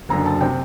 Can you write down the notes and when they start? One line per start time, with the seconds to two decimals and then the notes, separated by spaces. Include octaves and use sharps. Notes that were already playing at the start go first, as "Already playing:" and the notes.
0.09 F#1 F#2 D3 A#5
0.26 A5
0.41 C3 G5